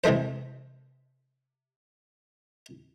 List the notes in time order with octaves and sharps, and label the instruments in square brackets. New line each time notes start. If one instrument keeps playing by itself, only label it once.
[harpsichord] C3 E3 G#3 A3 C5